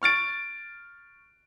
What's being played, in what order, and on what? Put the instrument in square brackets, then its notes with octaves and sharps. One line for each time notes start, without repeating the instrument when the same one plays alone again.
[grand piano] C#6 F6 A6 D7